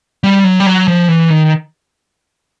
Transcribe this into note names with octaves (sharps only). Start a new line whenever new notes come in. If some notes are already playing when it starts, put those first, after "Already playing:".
G3
F#3
G3
F#3
F3
E3
D#3